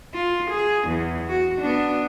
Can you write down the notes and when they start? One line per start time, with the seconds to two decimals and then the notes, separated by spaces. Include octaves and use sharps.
0.14 F4
0.50 G#4
0.88 E2
1.28 F#4
1.61 B3 D4